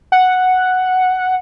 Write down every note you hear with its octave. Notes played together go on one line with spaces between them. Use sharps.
F#5